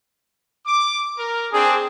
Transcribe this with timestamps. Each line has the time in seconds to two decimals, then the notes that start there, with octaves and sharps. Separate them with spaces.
0.66 D6
1.18 A#4
1.53 C4 D4 G#4